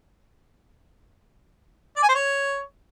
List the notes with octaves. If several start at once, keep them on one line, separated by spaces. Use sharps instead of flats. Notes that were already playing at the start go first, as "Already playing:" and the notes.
D5
G#5
C5
C#5